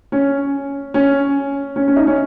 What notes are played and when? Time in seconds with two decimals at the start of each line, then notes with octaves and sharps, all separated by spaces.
0.12 C#4
0.94 C#4
1.76 C#4
1.88 C#4
1.96 D#4
2.07 C#4